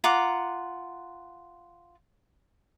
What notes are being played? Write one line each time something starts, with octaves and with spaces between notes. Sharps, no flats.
F4 F#5 A#5 D6